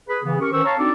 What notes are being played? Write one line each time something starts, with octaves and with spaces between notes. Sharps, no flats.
G#4 B4
C#3 E3 B3
C#4 G4 A#4 C#6
D#3 E3 C#4 C5 C#6 E6
C#5 F5 A5 A#5 C#6
C4 D4 D#4 F#4 A4 D5